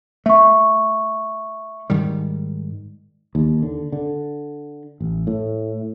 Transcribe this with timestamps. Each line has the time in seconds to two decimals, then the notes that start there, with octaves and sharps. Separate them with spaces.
0.26 A3 E5 C#6
1.90 G#2 D#3 G3
3.35 D#2
3.63 D3
3.92 D3
5.00 A1
5.27 A2